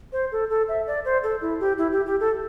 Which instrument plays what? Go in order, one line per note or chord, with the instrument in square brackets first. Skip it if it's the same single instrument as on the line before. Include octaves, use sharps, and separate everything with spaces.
[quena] C5
A4
A4
E5
D5
C5
A4
E4
G4
E4
G4
G4
A4